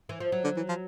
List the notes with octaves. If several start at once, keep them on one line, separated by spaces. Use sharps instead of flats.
E3
F3
F#3
D3
E3
F3